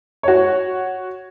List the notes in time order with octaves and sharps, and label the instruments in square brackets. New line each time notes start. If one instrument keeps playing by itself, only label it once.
[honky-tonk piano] F#4 C#5